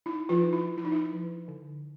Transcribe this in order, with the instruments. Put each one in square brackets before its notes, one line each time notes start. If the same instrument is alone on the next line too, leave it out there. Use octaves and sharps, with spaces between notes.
[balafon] D#4 E4
F3 F4
D#4
E4
F3 E4
D#4
E4
F3
D3